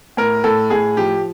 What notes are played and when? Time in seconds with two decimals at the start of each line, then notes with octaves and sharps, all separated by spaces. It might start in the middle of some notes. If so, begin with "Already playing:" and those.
0.17 A2 A#4
0.44 A2 A4
0.70 A2 G#4
0.97 F3 G4